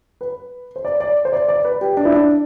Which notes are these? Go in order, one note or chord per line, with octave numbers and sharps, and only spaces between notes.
B4
C5
D5
D5
C5
D5
D5
B4
G4
D4
E4
D4